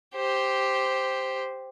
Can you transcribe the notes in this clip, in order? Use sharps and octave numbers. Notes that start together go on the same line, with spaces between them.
G4 C5